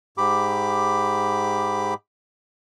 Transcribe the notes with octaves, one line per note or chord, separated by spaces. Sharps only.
G#2 G4 B5 D6